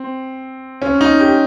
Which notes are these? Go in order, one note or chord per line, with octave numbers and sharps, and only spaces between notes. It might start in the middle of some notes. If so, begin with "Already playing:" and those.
Already playing: C4
C#4
D#4
G4